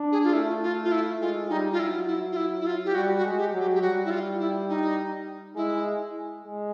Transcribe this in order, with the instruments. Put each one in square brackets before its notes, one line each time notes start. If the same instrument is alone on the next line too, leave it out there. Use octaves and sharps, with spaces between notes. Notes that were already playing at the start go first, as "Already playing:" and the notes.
Already playing: [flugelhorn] D4
[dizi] G#4
F4
[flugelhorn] A3 [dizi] E4
[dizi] F4
F4
E4
[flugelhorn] G#3 [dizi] F4
[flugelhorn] G3 [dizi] D#4
[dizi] F4
[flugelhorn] F#3 [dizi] E4
[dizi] E4
F4
E4
E4
F4
G4
[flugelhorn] G3 [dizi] F#4
[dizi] F#4
[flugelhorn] G#3
[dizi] G4
[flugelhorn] F#3
[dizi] G4
G4
[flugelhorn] G3 [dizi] F#4
[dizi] E4
F4
E4
D#4
[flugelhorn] G#3 [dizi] E4
[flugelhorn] G#3